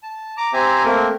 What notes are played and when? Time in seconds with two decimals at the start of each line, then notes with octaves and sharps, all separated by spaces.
0.03 A5
0.37 A#5 D6
0.53 C4 G4 C5 E5 G#5 A#5
0.85 A3 A#3 C4 A#4